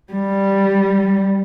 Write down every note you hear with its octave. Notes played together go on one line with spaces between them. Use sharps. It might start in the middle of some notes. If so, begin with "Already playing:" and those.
G3